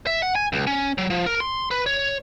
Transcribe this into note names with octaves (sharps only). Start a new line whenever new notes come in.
E5
F#5
G#5
C#2
C#4
F#3
F3
A#4
C6
B4
C#5